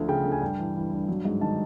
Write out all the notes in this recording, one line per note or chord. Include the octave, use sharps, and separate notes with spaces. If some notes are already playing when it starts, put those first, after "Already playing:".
Already playing: D2 F3
C#3 G5
D2
G#5
G2 G5
E3
E3
G2
F#3
G#2
D#3 A5